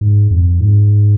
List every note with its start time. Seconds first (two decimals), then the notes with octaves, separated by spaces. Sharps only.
0.01 G#2
0.31 F2
0.60 G#2